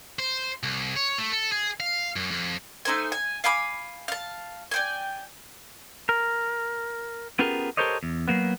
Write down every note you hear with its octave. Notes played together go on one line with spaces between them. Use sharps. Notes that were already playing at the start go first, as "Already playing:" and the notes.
C5
C2
C#5
A3
A4
G#4
F5
F#2
F2
A3 D#4 C5 G#5
G#5
F5 G#5 B5 D6
F5 A5
D5 G5 G#5
A#4
B3 C#4 F4 G4 G#4 A#4
G4 A4 A#4 C5 C#5 D#5
E2
F#3 G#3 A#3 B3